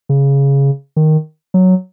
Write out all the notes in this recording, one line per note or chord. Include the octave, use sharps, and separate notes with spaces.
C#3
D#3
F#3